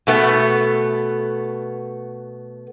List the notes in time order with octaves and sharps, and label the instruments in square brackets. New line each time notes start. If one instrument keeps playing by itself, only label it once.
[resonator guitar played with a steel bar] B2 A3 B3